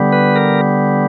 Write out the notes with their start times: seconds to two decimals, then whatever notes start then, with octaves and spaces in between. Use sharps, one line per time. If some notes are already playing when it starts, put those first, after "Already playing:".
Already playing: D3 G3 B3
0.13 B4
0.36 A#4